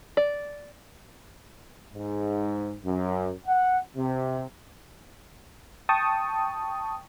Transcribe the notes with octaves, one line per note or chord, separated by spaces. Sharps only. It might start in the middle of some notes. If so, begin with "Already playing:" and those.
D5
G#2
F#2
F#5
C3
G5 A5 C#6 D#6